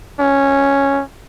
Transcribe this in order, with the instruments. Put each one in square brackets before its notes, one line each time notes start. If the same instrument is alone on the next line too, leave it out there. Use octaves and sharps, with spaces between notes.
[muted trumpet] C#4